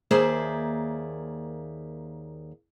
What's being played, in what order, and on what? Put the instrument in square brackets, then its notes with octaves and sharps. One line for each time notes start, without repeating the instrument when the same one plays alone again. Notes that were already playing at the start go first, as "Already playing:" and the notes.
[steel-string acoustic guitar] D#2 A#3 G#4 C5 D5 E5